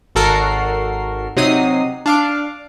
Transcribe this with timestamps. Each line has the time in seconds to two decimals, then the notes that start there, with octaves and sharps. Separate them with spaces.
0.15 G#1 F#4 A4 A#4 C7
1.36 C3 F#3 D#4 D#6 C7
2.06 D4 F5 D6